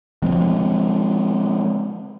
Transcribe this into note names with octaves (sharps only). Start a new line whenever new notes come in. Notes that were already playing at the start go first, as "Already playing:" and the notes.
F3 G#3 C4